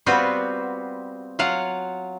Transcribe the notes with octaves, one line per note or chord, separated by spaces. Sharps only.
G3 B3 C4 F4 F#4 B4
F#3 F4 F5 F#5